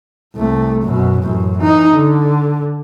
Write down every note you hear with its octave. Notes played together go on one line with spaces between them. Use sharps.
C2 A3
F#2 B2
A1 F#2
E3 D#4
D3